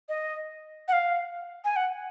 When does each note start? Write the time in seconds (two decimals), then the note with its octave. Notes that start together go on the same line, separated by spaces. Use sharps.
0.09 D#5
0.88 F#5
0.93 F5
1.64 G#5
1.76 F#5